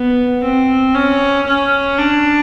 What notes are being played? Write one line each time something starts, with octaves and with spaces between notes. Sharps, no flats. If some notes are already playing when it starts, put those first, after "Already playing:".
Already playing: B3
C4
C#4
C#4
D4